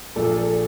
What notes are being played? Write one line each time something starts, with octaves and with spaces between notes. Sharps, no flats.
A#1 A#2 F3 A4
A4